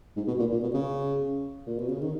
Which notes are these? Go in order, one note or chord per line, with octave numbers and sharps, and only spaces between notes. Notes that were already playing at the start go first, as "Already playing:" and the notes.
G#2
B2
A#2
A#2
B2
C#3
A#2
B2
C#3
D#3